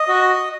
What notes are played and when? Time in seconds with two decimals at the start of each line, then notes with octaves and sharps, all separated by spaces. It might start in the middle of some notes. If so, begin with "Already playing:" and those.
Already playing: D#5
0.08 F#4